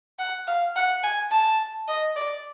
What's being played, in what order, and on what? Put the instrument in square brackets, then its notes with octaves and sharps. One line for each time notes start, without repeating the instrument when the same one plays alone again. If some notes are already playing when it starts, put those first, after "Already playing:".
[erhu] F#5
F5
F#5
G#5
A5
D#5
D5